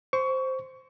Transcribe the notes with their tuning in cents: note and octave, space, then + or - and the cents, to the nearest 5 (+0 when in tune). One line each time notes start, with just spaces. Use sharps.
C5 +0 C#6 +20